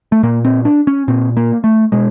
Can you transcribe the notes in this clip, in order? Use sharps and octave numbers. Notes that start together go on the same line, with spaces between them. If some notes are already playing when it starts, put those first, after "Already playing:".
A3
A#2 A#3
C4
D4
C#4
A#2 C4
A#3
A3
B2 G#3